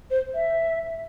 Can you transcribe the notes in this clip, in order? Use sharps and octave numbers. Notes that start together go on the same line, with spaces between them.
C5
E5